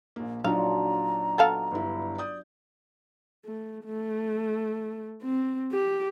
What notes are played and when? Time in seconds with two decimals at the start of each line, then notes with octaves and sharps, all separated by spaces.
0.16 A#1 A#3
0.44 A#1 F#3 D4 D#4 F4 F#4 F5 A#5
1.38 B3 A4 F5
1.71 G1 G2 E4
2.18 D5 D#6 G6
3.45 A3
3.85 A3
5.23 C4
5.72 G4